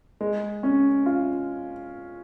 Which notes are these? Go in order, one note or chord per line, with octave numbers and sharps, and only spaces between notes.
G#3
C#4
F4